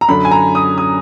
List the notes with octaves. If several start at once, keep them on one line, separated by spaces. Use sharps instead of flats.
A#5
F#2 D3 B5
G#5
A#5
D#6
D#6